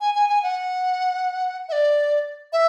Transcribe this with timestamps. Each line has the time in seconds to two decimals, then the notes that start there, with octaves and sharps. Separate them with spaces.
0.01 G#5
0.15 G#5
0.29 G#5
0.43 F#5
1.69 E5
1.72 D5
2.53 E5